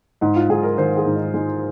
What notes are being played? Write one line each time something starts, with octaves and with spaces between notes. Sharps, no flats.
G#2 D#4
F4
G#2 G#4
A#4
D#3 C5
G#4
G#2
D#4
G#3 D#4